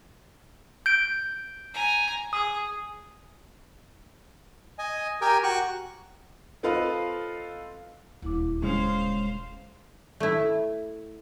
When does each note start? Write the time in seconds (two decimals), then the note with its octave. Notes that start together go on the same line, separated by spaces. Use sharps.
0.86 G6 D7
1.74 G#5 A#5
2.33 G#4 D#6
4.79 D#5 G#5
5.21 G4 A#4 G5 G#5
5.43 F#4 C#6 F#6
6.63 C4 F4 A4 B4 D#5 F5
8.22 D#1 D2 E4 D6
8.62 C#3 G#3 C#4 C5 F5
10.20 A3 E4